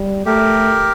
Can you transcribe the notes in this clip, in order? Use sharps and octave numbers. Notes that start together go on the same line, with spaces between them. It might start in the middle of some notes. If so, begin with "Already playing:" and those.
Already playing: G3
A3 G4 A#4